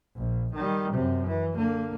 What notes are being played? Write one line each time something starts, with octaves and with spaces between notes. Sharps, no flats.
A#1
D#3 G3
F#2 C3
E3
D3 A#3